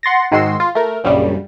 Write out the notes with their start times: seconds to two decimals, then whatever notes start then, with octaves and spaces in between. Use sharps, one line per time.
0.03 F#5 C6 A6 A#6
0.31 G#2 D#3 G#3 F#4 C6 E6
0.60 F4
0.75 A3 A#4
1.04 A#1 F#2 C#3 G3